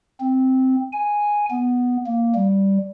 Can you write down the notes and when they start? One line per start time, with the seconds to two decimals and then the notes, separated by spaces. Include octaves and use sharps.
0.20 C4
0.92 G#5
1.50 B3
2.06 A#3
2.35 G3